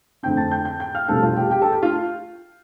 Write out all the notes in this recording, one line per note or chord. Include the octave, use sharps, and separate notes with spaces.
F2 D3 A3 C4 G5 G6
A5 A6
G5 G6
G5 G6
G5 G6
F5 F6
F1 E2 B2 G3 C4 A4 A5
F4 F5
G4 G5
G4 G5
A4 A5
G4 G5
F4 F5